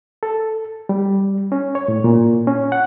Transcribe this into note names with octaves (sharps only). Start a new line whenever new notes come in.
A4
G3
C#4
C#5
A2
A#2
C#4
F#5